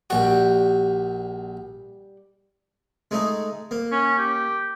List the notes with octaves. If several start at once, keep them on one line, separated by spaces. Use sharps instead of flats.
A#1 G3 F#4 G4
G#3 A3 D#4
A#3
C#4
G4